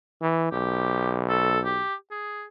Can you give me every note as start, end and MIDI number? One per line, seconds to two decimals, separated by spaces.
0.22 0.51 52
0.52 1.81 35
0.52 1.19 67
1.29 1.60 69
1.65 1.94 67
2.11 2.45 68